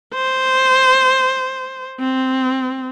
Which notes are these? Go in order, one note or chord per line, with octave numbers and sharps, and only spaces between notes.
C5
C4